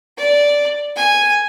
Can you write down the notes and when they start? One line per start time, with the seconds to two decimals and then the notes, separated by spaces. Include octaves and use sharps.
0.18 D5
0.96 G#5